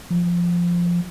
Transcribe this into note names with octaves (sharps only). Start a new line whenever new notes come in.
F3